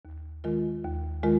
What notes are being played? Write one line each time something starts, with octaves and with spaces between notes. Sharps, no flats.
D#2
D#3 G#3 F4 A#4
D#2
D#3 G#3 F4 A#4